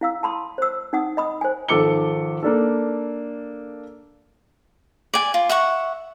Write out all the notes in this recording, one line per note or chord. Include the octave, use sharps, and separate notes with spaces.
E4 F5 E6
A5 B5 C6 D#6
C5 E6
D#4 F#5 D#6
D#5 B5 D#6
C5 G#5
G#1 F3 A4 D6 C#7 G7
A#3 D4 A4
D5 G#5
F4
E5 F#5 C#6